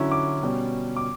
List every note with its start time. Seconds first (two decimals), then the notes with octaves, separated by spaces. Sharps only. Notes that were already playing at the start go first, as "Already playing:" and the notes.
Already playing: D3 F#3 C#4 E4
0.11 D6
0.43 B2 G3 C#4
0.96 D6